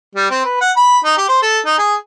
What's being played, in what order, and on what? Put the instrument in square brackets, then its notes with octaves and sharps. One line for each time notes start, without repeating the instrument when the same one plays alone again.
[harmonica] G3
C4
B4
F#5
B5
D#4
G4
C5
A4
D#4
G#4